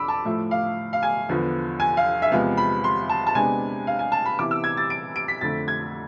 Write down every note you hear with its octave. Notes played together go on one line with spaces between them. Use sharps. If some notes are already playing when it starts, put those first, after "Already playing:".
Already playing: F2 D3 D4 B5 D6 E6
A5
A2 F3 A3 E5
F5
F5
G#5
E2 D3 F3 B3
G#5
F5
E5
E2 C3 F3 G#3 B3 F5
B5
C6
A5
A5
C3 G#3 B3 D4 G#5
F5
G#5
A5
B5
C3 E3 B3 E4 D6
E6
G#6
A6
D7
D7
B6
F2 D3 A3 A6
G#6